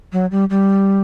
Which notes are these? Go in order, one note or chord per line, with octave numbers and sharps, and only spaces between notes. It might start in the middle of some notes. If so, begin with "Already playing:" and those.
F#3
G3
G3